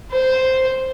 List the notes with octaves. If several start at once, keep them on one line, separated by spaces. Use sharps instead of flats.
C5